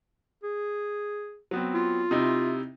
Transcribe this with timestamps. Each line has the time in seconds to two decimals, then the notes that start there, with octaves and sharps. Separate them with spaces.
0.43 G#4
1.51 F#3 B3 C4
1.74 F4
2.11 C3 D#4 E4